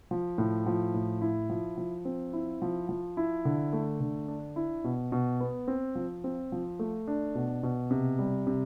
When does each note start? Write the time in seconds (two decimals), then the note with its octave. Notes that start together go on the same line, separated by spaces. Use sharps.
0.11 F3
0.38 A2
0.66 F3
0.94 A2
1.21 E4
1.50 F3
1.78 F3
2.05 C4
2.33 E4
2.62 F3
2.89 F3
3.17 E4
3.45 D3
3.73 A3
4.00 D3
4.28 D4
4.56 E4
4.84 B2
5.12 B2
5.40 B3
5.68 C4
5.95 F3
6.24 C4
6.52 F3
6.79 A3
7.07 D4
7.35 B2
7.63 B2
7.91 C3
8.19 G3
8.47 C3